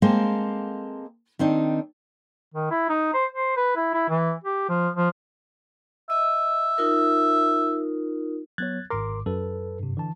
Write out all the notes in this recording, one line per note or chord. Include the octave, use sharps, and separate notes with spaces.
G#3 A#3 C4 A4 C5 F5
D#3 C4 D4 D#4
D#3
E4
D#4
C5
C5
B4
E4
E4
E3
G4
F3
F3
D#5 E5
D#4 F4 A#4
F#3 B3 C#5 F#6 G#6 A6
G#1 G#2 A#4 C6 D6
F#2 A4 B4
G2 C3
D3 E3 A5